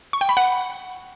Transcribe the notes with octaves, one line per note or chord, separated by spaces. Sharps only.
C#6
G5
B5
F#5